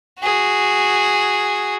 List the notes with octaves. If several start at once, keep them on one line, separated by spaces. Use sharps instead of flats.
F#4 G#4